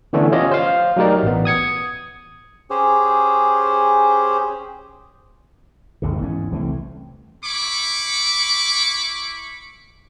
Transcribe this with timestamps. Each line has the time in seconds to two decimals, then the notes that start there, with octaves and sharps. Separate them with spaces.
0.13 D3 E3 A3 B3 C#4 D4
0.32 C#4 F4 G4 C#5 D#5
0.51 C5 F5
0.97 F#3 A3 D#4 G4 A#4 D5
1.23 A1 B3
1.45 D#6 G#6 C#7
2.70 C#4 G4 G#4 C5
6.02 G#1 D#2 C3
6.20 E2 G#2 C#4
6.51 C2 E3 A3 C4
7.44 E4 B5 C#6 D6